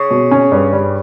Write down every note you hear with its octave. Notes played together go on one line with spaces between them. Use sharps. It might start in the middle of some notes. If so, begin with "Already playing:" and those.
Already playing: C#3
B2
C#4
G2
G3